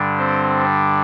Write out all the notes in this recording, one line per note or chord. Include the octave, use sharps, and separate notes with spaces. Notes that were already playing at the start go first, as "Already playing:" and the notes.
Already playing: G2 D3 G3 D4
C4 C5